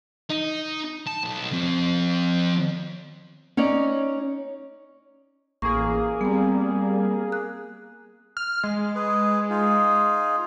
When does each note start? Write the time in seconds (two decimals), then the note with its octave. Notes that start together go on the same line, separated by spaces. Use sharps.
0.30 D#4
1.07 A5
1.24 B1
1.52 F3 C4
3.57 C#4 D#4 C#5 D5
5.62 A1 A#3 G#4 C#6
6.21 G3 B3 C4
7.32 F#6
8.37 F6
8.63 G#3
8.95 G#4 B4
9.50 D#4 F4 G#4